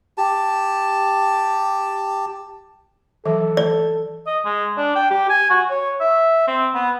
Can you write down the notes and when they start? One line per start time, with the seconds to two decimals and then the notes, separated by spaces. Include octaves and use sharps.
0.18 G4 A5
3.25 E3 F#3 A4 E5
3.57 D5
4.27 D#5
4.45 G#3
4.77 D4
4.96 G5
5.10 G4
5.29 G#5
5.50 F#4
5.70 C#5
6.01 E5
6.47 C4
6.75 B3